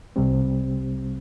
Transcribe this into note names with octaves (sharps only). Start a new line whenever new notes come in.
C2 C3 G3 C4